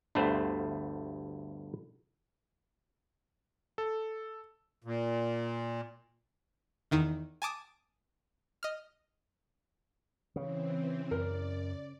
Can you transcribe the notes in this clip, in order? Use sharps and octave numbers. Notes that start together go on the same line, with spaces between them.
G1 D2 G2 A3 C5
A4
A#2
E2 D#3 D#4
G#5 A5 D6 D#6
D#5 F6
C#3 E3 C4
F#2 A#4 D5